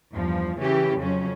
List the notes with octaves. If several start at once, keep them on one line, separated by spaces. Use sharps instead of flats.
E2 G2 F3
C#3 E3 C#4 G4
F2 C#3 F#3 C#4